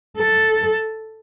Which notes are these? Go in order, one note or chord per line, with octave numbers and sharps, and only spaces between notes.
A4